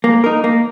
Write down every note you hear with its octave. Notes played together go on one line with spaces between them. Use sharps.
A#3
D#4 A#4
A#3